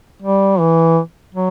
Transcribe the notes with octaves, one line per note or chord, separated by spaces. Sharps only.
G3
E3
F#3